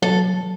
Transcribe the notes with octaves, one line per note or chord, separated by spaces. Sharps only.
F#3 A4